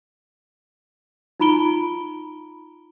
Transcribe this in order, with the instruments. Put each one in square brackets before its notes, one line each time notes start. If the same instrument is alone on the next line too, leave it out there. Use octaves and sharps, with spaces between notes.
[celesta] D#4 F4 A#5 B5 D7 G7